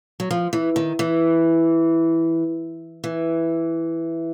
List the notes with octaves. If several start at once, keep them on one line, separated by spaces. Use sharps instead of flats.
F#3
F3
E3
D#3
E3
E3